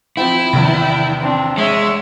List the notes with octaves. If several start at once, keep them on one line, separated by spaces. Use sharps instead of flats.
F3 C4 E4 G5
A#1 E2 C3 D#3 B3
C4 D4
G#3 C#5 E5